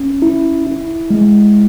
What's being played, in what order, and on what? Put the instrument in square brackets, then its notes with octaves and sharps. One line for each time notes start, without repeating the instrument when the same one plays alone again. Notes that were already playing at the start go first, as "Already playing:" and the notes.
Already playing: [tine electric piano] C#4
E4
E4
G#3